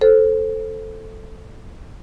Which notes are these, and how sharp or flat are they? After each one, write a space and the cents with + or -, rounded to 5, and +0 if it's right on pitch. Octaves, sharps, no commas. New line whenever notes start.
A4 +0 C5 +5